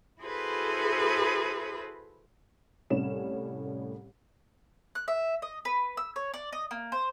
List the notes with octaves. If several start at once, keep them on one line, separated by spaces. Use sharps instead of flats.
E4 F#4 G#4 A4 B4 C5
C2 A2 G3 C#4 E7
F#6
E5
D#5
B4
E6
C#5
D5
D#5
A#3
C5